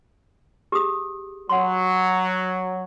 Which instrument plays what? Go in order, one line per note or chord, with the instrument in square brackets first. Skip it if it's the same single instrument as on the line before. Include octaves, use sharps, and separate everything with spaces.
[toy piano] G4 G#4 D#6
[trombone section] F#3 [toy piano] F#5 C6